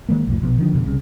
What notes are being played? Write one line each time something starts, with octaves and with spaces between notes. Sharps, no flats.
D#3 G#3 A#3
B1 F2 A2
A#1 B2 B3
D3 D#3 F3 D4
F1 B2 D3
C2 C#3